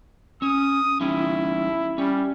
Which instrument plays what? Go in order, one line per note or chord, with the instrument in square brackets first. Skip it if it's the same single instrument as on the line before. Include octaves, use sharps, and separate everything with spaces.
[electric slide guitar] C#4 [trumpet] D#6
[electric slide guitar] G3 C#4 D#4 [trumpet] E4
[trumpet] G3 [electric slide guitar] C#4